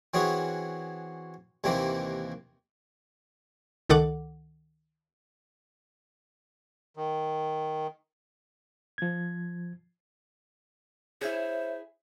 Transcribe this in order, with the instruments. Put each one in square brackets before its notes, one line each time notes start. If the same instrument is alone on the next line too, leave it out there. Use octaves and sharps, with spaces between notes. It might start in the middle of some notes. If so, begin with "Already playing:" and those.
[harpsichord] E3 C4 C#4 F#4 G#4
D#2 C3 D#3 E3 A#3 C4
[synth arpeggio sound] C#2 D#3 A4 F#5 D6
[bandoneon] D#3
[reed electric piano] F3 G#6
[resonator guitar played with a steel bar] E4 G#4 [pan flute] C5 [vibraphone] C#5 E5